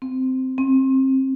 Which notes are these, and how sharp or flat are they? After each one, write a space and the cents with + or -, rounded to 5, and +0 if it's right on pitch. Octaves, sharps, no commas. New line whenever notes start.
C4 -10
C4 +25